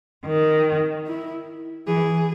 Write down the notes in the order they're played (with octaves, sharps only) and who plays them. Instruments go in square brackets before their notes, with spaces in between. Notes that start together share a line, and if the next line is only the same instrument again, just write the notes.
[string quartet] D#3
[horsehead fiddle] E4
[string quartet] E3 [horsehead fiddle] G#4